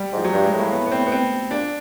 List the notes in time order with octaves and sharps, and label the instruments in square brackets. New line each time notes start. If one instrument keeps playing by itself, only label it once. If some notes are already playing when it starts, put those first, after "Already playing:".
Already playing: [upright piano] G3
[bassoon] G#2 [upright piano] F3
[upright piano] F#3
[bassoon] G2 [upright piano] G3
[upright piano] G#3
[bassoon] A2
[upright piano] A#3
B3
B3
C4
B3
C4
[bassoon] A#2 [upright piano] D4